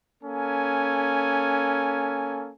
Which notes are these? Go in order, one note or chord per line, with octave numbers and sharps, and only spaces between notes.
A#3 C#4 A4 G#5